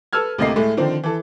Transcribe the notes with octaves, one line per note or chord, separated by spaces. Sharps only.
A4 B4 E6 F6 G#6
D2 A2 C3 A#3 D#5 C7
A2 G#3 A3
D3 D#3 F3 C4
E3 A4